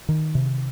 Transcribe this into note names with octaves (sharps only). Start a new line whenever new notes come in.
D#3
C3